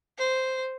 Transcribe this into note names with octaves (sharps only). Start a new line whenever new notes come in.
C5